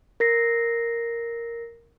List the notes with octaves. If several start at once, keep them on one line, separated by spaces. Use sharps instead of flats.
A#4 A#6 C7